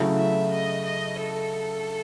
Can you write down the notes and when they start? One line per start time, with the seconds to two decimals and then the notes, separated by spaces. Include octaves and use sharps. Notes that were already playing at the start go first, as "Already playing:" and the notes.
Already playing: C#3 F#3 A3 E4
0.17 E5
0.52 D#5
0.85 D#5
1.20 A4